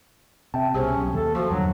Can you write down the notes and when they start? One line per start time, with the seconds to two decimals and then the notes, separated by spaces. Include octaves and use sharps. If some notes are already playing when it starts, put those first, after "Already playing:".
0.54 C3 E5 G5 A5
0.74 C2 B2 C#4 G4 G#4 C5
0.97 B1
1.13 D#2 A4
1.35 F3 F#4 C#6
1.50 E2 G2 D3 F#3